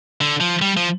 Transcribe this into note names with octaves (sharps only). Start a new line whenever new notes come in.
D3
F3
G3
F3